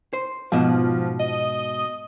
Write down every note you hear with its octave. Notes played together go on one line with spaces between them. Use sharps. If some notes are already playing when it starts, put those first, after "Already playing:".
C5
G#2 B2 F3
D#5